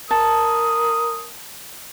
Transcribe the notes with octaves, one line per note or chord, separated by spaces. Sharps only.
A#4 A5 D#6